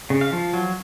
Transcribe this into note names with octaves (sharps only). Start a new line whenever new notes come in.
C#3
F5
F3
F#3